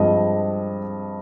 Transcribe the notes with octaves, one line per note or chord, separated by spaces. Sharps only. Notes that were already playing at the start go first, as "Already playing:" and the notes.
Already playing: G2 F3 G#3 C4 D#5